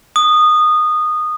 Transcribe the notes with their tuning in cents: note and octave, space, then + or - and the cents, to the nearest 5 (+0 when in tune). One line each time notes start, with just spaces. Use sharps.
D#6 -20